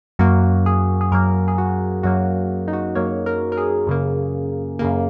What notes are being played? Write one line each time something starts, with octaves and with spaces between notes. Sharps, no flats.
F#2 F#3 A#3 F#4
G#4
G#4
F#2 F#3 A#3 A#4
G#4
F#4
F#2 F#3 A#3 F#4
D#4
F#4
F#2 F#3 A#3 C#5
A#4
A#4
G#4
F#2 C#3 A#3
F#2 C#3 A#3